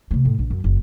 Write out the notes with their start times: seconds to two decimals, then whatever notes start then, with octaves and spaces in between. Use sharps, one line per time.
0.11 C3 A3
0.25 A2
0.39 A#1
0.50 F#2
0.64 F#1